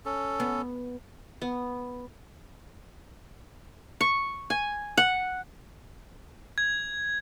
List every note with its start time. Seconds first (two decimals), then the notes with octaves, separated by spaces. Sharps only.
0.06 C#4 A4
0.40 B3
1.42 B3
4.01 C#6
4.50 G#5
4.98 F#5
6.58 G#6